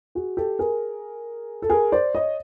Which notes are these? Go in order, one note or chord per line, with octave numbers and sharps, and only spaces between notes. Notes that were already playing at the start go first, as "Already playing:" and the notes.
F#4 G#4
G4 A4
G#4 A#4
A4
G#4 A#4
C5 D5
C#5 D#5